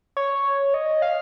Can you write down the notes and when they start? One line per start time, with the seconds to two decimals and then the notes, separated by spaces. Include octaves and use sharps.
0.17 C#5
0.74 D#5
1.02 F5